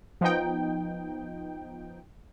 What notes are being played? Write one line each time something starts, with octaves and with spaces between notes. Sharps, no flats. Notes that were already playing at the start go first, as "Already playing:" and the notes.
F3 B3 D#4 G5